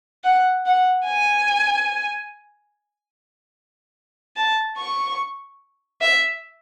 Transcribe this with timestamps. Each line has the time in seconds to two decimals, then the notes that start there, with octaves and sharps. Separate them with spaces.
0.24 F#5
0.66 F#5
1.07 G#5
4.37 A5
4.78 C#6
6.01 E5